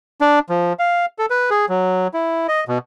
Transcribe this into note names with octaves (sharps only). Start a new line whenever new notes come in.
D4
F3
F5
A4
B4
G#4
F#3
E4
D#5
B2